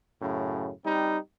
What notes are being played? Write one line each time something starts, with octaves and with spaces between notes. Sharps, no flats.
F#2 A2 C#3
G3 C4 D#4